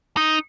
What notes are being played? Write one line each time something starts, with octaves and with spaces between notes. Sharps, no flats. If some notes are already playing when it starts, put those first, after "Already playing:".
D#4